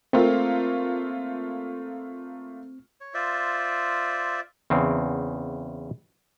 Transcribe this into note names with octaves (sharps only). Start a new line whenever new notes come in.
A3 A#3 C4 F4
C#5
F4 C5 D5 E5
E2 C#3 C4